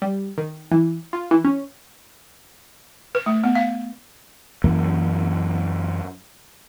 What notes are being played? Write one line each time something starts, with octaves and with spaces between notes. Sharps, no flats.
G3
D#3
E3
F4
E3
C#4
B4
A3
B3
F5
F#2 E3 A#3